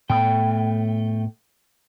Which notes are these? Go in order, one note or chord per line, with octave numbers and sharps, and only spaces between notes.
A2 A3 B3 G5